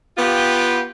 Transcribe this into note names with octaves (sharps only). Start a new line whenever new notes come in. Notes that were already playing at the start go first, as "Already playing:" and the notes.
B3 F4 G4